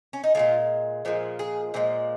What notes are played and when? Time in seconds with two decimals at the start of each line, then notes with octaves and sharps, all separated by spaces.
0.13 C#4
0.24 D#4
0.35 A#2 F3 G#3 F4
1.05 A#2 F3 G#3
1.39 G#4
1.74 A#2 F3 G#3